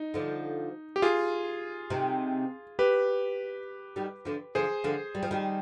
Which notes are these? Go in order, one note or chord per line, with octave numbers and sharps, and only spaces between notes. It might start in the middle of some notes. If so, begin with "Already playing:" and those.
Already playing: D#4
D3 F3
G4
F4 G#4
C3 D#3
G4 B4
D#3 G3
D3 F3
D3 F3 G#4 C5
D3 F3
G3
F3
D#3 G3